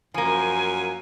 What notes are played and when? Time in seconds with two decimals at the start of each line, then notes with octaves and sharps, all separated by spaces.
0.14 F#2 F3 A#3 G#5